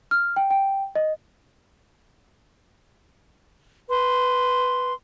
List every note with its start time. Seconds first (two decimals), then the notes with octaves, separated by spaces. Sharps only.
0.11 F6
0.36 G5
0.51 G5
0.95 D#5
3.90 B4 C6